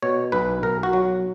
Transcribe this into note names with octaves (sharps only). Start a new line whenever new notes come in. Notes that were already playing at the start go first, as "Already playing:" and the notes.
B2 C#5
B1 B4
B1 A#4
F#4
F#3